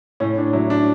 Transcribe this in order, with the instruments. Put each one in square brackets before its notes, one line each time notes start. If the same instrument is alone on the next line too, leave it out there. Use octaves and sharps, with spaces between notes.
[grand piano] A2 C#4
D4
F#3 E4
D4